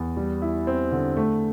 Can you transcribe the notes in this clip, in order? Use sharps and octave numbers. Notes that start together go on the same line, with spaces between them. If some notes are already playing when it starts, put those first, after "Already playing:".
Already playing: E2
G3
E4
C4
D3
A3